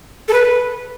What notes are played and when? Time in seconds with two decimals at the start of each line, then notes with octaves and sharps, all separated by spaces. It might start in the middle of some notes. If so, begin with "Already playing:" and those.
0.28 A4
0.33 B4